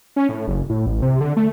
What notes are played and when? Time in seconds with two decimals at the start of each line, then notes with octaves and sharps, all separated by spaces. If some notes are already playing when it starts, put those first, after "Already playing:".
0.16 C#4
0.29 A2
0.48 F#1
0.70 A2
0.86 A1
1.02 C3
1.21 D3
1.37 A3